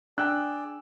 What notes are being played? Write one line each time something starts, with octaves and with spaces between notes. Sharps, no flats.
D4 G#4 D5 G5 E6 F#6